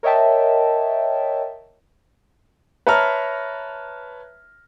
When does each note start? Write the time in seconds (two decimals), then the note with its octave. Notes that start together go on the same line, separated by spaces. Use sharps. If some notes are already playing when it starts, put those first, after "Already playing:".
0.03 A#4 C#5 D#5 E5 G5 A5
2.87 B4 C#5 E5 A5 A#5 F6